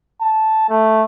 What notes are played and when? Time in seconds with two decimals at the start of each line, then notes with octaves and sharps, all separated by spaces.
0.21 A5
0.69 A3